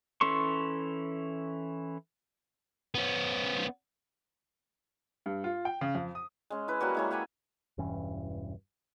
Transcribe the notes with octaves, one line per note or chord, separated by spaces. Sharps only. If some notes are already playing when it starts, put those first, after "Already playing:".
E3 C#4 A4 C6 C#6
B3 C#4
G2
F4
G5
C#3
F2
D#6
G#3 C#4
E4 B4
F#3 G3 A#3 F#4
G#3 E4 C#5
G4 F#5 G#5 B5
E1 G2 E3 C#4